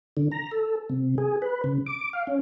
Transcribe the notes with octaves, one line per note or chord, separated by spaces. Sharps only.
D3
A#5
A4
C3
G#4
B4
C#3
D6
F5
C#4